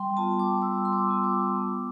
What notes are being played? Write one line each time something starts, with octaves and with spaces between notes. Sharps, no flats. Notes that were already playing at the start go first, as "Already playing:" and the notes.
Already playing: G3 G5 C6
B3 F4 A5
D6
G3 E6
C6
D6
B3 F4
D6
B3